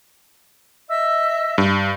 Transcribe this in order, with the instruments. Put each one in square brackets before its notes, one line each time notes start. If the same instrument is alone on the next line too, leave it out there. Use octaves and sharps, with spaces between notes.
[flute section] D#5 E5 E6
[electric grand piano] G2